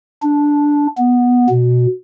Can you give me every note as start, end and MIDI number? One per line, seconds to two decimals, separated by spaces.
0.23 0.87 62
0.97 1.47 59
1.50 1.86 47